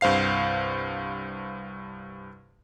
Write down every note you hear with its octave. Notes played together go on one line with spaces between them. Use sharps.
C2 G2 C5 F5 C7